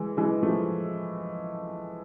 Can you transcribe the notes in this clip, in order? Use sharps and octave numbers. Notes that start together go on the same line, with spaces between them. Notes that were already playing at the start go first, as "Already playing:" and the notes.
Already playing: E3 G#3
E3 G#3
F3 A3